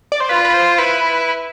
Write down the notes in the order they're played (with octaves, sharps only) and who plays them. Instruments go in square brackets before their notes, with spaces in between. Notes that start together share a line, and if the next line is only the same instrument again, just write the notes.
[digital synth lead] D5
C5
[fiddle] F4 [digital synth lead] B4
[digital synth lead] B4
C5
[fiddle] E4 [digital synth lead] B4